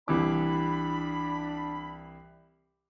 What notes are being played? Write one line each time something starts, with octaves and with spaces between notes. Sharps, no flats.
C2 E3 D4 B5 D6